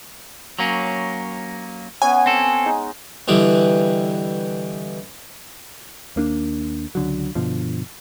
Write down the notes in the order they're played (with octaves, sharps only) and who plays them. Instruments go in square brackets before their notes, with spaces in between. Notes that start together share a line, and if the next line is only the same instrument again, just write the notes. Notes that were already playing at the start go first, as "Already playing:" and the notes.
[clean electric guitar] F#3 A#3 C#4
[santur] B3 C#4 F#5 [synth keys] G#5
[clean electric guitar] C4 A4
[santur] G#3 D#4
[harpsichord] B2 D3 E3 G3
[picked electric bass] D#2 A#3 D4
C#2 D3 F#3
G2 B2 D3 F3